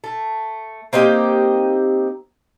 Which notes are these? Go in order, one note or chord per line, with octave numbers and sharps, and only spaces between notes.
A3
A#3 C4 D#4 G4